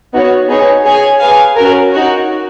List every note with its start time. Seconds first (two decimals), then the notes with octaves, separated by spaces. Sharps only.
0.14 B3 D#4 F#4 C#5
0.49 B3 D#4 G#4 C#5
0.85 G#4 C#5 G#5
1.20 G#4 B4 F5 G#5
1.56 C#4 F#4 A#4
1.91 D#4 F#4 C#5